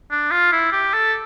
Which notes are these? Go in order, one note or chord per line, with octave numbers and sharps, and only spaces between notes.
D4
F4
E4
G4
A4